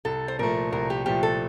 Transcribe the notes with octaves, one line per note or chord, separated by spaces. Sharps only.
C2 A4
C5
A#2 F3 A3 A#4
C2 A#4
G4
A#2 F3 A3 G4
A4